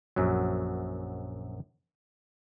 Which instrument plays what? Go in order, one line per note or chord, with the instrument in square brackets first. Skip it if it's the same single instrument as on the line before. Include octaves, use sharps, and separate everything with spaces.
[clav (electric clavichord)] A#1 F#2 F#3